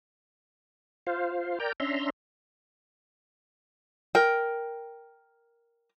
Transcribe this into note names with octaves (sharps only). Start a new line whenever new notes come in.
F4 C5 F5
A#4 D5 G5 A#5 G6
C#4 D4 E5 A#5 C6
A#4 G5